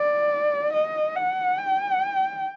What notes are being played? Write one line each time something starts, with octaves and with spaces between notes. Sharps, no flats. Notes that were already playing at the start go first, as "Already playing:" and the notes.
Already playing: D5
D#5
F#5
G5